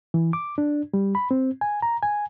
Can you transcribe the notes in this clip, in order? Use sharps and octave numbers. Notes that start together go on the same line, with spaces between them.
E3
D6
D4
G3
B5
C4
G#5
A#5
G#5